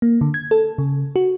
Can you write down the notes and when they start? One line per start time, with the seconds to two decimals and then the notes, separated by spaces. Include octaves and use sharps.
0.02 A#3
0.21 D3
0.34 G#6
0.51 A4
0.78 C#3
1.16 F#4